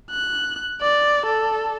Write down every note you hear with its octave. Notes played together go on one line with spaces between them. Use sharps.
F#6
D5
A4